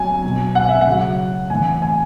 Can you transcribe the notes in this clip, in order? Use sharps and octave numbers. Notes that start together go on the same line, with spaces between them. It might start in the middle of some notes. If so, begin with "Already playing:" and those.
Already playing: F#3 G#5
B2 F#3
F#5
E5
F#5
C#3 F#3
A2 E3 G#5
G#5